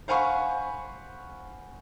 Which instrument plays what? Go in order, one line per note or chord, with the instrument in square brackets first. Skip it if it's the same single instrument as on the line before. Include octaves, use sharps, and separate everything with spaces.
[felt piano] C5 F5 F#5 G#5 B5 C#6